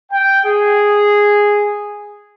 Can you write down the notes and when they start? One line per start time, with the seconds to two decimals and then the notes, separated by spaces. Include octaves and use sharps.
0.12 G5
0.46 G#4